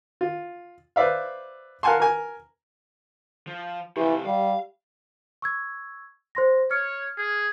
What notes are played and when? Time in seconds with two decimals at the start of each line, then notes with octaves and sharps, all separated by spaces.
0.21 F4
0.96 B4 C5 D5 E5 F5
1.83 A#4 F5 F#5 G#5 A5 C6
2.00 A#4 G#5
3.47 F3
3.97 C3 E3 F3 G4
4.26 G3 F5
5.42 C#6 E6 G#6
6.35 C5 C6 A#6
6.71 C#5 F6 C#7
7.18 G#4